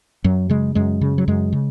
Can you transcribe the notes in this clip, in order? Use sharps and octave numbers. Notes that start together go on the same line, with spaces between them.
F#2 F#3
C#3 G#3
F#2 G#3
C#3
F#3
F#2 G#3
C#3